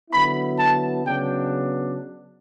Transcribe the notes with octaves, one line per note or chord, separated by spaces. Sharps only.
D3 F#3 B3 E4 B5
A5
C#3 F#3 B3 D4 G5